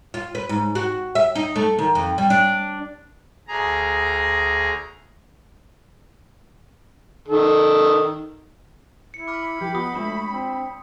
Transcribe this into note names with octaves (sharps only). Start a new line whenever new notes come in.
F4
B4
G#2
F#4
E5
D#4
A3
D#3
F2
G3
D4
D2 G#4 A#5
D#3 A4
E4 C#7
B5 D6 F6
F3 G4
B3 F4 D#6
G#3 A3 D4 F4
C4